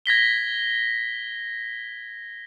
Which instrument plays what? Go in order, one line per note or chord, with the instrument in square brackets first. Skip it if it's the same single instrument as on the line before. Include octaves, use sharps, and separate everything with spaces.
[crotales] G#6 A#6 B6 G7